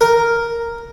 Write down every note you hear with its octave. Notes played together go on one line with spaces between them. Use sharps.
A#4